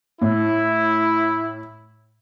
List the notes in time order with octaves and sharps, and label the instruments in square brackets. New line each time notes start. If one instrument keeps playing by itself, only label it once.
[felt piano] A2 [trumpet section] E4